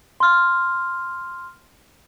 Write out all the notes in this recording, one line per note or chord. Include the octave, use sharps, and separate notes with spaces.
C6 F6